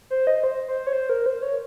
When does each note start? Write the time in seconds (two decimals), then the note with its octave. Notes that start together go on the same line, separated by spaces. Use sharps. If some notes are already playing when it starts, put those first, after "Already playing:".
0.10 C5
0.27 D#5
0.43 C5
0.68 C5
0.87 C#5
0.93 C5
1.09 A#4
1.26 C5
1.42 C#5